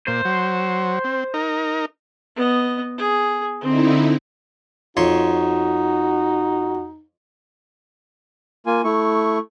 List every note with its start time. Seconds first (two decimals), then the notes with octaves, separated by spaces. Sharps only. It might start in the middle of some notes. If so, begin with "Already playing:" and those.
0.08 A#2 C5
0.25 F#3
1.04 C4
1.34 D#4 A#4
2.36 B3 D#5
2.98 G#4
3.61 D3 C4 D#4 E4
4.97 F2 D#4 F#4 C#5 C6
8.66 A#3 F4 G#5
8.84 A3 E4 C#6